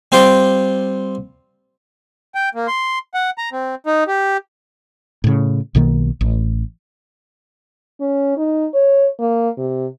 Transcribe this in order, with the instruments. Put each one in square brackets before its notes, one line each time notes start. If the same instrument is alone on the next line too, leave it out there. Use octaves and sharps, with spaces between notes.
[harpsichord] G3 C4 F4 C5 C6 D6
[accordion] G5
A#3
C6
F#5
A#5
C4
D#4
G4
[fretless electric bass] A2 C#3
B1 B2 D#3 A#3
A1
[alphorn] C#4
D#4
C#5
A#3
C3